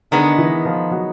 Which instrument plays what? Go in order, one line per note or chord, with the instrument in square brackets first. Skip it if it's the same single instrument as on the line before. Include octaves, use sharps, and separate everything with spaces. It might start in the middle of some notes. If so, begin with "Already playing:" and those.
[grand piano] D3 D4 [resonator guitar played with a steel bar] D#3 G#3 B3
[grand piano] E3 E4
F3 F4
F#3 F#4